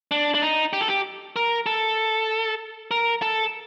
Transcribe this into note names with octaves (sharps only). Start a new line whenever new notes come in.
D4
D4
D#4
G4
A4
G4
A#4
A4
A#4
A4